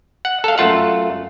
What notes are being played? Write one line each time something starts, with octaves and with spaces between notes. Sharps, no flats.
F#5
A4 F5
F#2 A3 F4 F#5